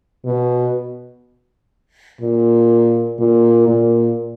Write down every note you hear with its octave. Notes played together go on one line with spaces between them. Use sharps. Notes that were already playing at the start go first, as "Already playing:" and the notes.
B2
A#2
A#2
A#2